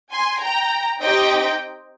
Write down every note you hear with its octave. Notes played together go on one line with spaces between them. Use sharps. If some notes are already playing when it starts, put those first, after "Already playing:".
G#5 C6
G5 A#5
C4 D#4 G4 D#5 G5